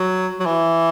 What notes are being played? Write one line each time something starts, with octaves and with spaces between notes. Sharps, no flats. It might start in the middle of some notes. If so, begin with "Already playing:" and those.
Already playing: F#3
F#3
E3